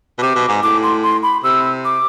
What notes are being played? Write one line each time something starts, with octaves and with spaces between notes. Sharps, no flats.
B2
C3 D6
B2
G#2
A2 D6
C6
C6
B5
C3 E6
D6